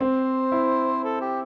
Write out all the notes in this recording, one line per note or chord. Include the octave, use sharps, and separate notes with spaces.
C4 C5
E4
A4
G4